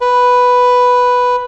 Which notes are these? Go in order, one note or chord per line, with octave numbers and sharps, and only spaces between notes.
B4